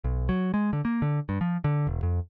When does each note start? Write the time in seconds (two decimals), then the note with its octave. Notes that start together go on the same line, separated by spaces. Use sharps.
0.04 B1
0.29 F#3
0.54 G#3
0.73 D3
0.85 A#3
1.02 D3
1.29 G2
1.41 F3
1.64 D3
1.87 E1
2.03 F2